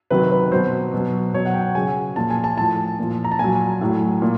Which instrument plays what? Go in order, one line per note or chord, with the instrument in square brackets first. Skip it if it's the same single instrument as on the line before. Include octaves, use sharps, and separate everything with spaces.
[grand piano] C3 D#3 F#3 B4
B4
B2 F#3 C5
B2 F#3
B2 F#3 C#5
F#5
G5
C#3 F#3 G#5
A#2 F3 A5
G#5
A5
A2 F3 A5
A#2 F3
A#5
A5
A#2 F#3 G#5
A2 F#3
A#2